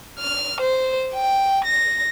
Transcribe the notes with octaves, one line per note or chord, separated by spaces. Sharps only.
F6
C5
G5
A#6